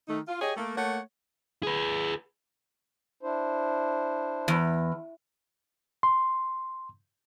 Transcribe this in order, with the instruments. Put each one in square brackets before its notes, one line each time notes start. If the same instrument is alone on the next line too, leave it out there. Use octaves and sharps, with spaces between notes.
[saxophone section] D#3 A3 D#4
F4
G4 G#4 C#5 D#5
A3 A#3
A3 A#3 C#5 F#5
[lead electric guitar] G#4 B4
[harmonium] D4 E4 C5
[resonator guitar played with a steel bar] E2
[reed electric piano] C6